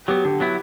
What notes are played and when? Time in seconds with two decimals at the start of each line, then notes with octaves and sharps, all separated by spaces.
0.08 F#3 B3 G4
0.25 D3 G4
0.40 F#3 B3 E4